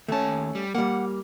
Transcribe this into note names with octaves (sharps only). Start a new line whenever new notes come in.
D#2 A3 C#4 A5
G3
G3 A#3 F#5